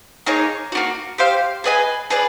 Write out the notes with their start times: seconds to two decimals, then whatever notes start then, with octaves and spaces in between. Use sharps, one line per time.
0.26 A#3 D#4 G#4 C#5
0.72 A#3 D4 F#4
1.18 G4 C5 F5
1.64 G#4 B4 D#5 G#5
2.10 G#4 B4 D5